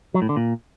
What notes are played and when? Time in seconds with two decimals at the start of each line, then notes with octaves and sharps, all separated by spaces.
0.14 F#3
0.22 A2
0.29 D3
0.36 A#2